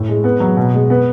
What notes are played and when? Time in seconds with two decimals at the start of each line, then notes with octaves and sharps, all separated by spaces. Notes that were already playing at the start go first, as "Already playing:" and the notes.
Already playing: A2
0.09 G#3
0.24 B3
0.40 F#3
0.57 B2
0.74 G#3
0.90 B3